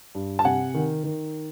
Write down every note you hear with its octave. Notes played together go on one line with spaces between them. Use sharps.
G2
A5
C3 F#5 G#5
D#3
D#3